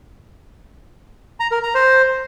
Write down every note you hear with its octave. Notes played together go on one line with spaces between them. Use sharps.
A#5
A#4
A#5
C5